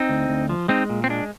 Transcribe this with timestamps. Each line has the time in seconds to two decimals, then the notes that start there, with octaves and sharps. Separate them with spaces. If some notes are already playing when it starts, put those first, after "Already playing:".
Already playing: C4 D#4
0.09 D2
0.29 D2
0.49 F3
0.68 G#3 C4 D#4
0.90 A#2
1.04 C4
1.09 G#3 D4